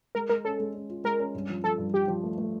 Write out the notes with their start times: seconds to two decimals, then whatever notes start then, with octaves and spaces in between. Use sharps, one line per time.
0.15 G#3 A#4
0.30 G#3 A#4
0.45 C#4 A4
0.60 G#3
0.74 C#4
0.90 F4
1.04 G#3 A#4
1.19 C#4
1.35 G2
1.49 F3
1.64 F3 A4
1.78 G2
1.93 F3 G4
2.08 F3
2.23 A3
2.38 A3